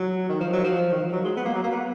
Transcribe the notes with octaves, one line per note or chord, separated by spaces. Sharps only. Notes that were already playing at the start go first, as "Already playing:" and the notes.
Already playing: F#3
D#3
F3
F#3
F3
D#3
F3
F#3
G#3
B3
A#3
F#3
A#3
B3